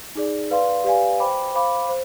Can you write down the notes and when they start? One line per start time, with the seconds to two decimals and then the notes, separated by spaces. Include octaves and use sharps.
0.15 D#4 G#4 D5
0.51 B4 D5 F5 C6
0.84 G4 B4 D5 F5 G#5
1.20 C5 G5 B5 D6
1.54 C5 F5 B5 D6
1.89 C5